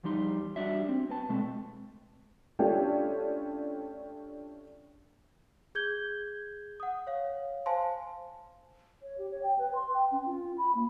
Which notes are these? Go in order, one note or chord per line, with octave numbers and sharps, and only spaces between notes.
E2 F3 G3 D#4 C6
G3 D4 F#4 D5 E5
C4
C4 B4 A5
B2 G#3 A3 C4
A3 C#4 D4 F4 G4
G#4 G6 G#6 G7
F#5 D#6
C#5 F5
C5 F5 G#5 A5 C6
C#5
G4
C#5
G5
B4
C6
G5
C#4
F4
B5
A#3